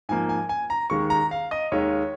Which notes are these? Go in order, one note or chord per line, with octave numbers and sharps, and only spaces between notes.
G#2 F3 A#3 G#5
G#5
G#5
A#5
D#2 D#3 G#3 C#6
A#5
F5
D#5
D#2 D#3 G#3 C#5